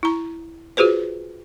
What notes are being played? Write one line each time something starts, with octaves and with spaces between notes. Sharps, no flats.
E4 A#5
F4 F#4 G#4 B4 C5